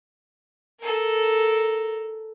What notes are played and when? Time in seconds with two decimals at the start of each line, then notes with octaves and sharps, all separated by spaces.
0.80 A4 A#4